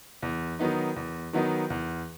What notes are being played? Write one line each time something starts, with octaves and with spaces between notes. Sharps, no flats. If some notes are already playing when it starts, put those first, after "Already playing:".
E2
D#3 F#3 B3 D#4
E2
D#3 F#3 B3 D#4
E2